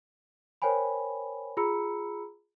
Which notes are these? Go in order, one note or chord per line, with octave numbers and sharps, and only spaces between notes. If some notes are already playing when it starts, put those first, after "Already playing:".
A#4 C5 C#5 G5 G#5 B5
F4 G#4 A#5 B5 E6 C#7